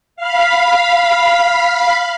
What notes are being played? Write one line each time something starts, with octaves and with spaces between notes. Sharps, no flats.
F5 B5